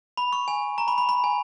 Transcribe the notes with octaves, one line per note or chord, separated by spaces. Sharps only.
B5
C#6
G#5
A#5
B5
B5
B5
G#5